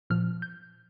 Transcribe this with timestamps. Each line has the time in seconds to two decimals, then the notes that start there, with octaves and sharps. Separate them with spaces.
0.10 A#2 F3 F6
0.42 G6